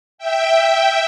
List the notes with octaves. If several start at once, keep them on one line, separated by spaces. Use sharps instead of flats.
E5 G5